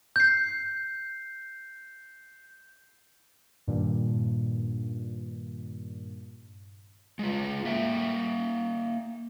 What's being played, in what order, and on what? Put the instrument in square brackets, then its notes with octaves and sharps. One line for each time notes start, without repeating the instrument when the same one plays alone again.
[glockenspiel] G6 C7
[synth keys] G2 A#2 D#3
[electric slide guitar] G#3 F4
A#3 E5 G5